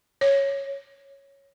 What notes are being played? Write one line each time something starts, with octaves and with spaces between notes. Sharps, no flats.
C#5